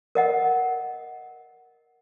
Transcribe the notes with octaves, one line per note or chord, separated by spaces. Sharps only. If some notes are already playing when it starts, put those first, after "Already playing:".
A#4 D#5 F#5